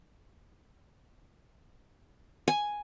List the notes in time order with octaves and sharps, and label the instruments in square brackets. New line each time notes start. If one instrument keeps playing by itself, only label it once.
[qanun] G#5